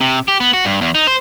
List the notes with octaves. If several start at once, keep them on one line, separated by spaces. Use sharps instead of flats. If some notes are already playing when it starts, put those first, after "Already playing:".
C3
G4
B3
F#4
G2
E2
D#4
C5